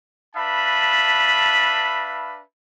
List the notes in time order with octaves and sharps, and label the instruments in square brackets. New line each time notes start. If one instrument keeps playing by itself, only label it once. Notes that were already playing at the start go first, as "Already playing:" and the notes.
[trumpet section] D4 B4 E5 F5 A5 B5